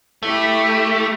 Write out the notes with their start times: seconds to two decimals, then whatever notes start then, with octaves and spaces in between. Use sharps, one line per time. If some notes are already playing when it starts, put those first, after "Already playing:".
0.23 A3 E4 G4